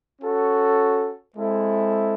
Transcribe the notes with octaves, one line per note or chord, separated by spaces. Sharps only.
C#4 F#4 A4
G#3 C4 E4 A4